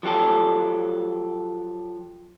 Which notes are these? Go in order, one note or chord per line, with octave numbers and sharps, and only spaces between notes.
F3 F#3 G4 A4